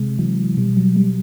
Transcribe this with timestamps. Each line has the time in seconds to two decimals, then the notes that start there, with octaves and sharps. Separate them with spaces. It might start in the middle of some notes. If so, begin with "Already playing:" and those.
Already playing: C3 G#3
0.19 E3 F#3
0.57 B2 G3
0.77 F#3
0.96 G3